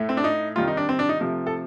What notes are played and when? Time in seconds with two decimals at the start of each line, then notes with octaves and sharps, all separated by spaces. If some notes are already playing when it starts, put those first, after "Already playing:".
Already playing: A2 A3
0.09 C4
0.17 D4
0.24 D#4
0.56 C3 D#3 G3 F4
0.67 D#4
0.77 D4
0.89 C4
0.99 D4
1.09 D#4
1.20 C3 F3 A3
1.47 A4